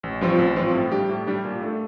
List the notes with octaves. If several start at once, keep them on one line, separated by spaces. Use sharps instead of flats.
A1
G2 F3 C4 F4
A1
G2 F3 C4 F4
A2
G3 D4 G4
A2
G3 D4 G4
A#2
A3 D4 A4